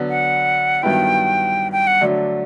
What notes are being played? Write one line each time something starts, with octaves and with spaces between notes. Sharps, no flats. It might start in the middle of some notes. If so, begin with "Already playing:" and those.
Already playing: D3 F#3 B3
F#5
G2 D#3 F#3 B3 E4 G5
G5
F#5
D3 F#3 A3 D4